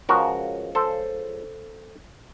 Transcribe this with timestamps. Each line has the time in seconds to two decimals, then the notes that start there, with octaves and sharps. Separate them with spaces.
0.09 C#2 C#3 F3 F#4 A#4
0.75 A4 C5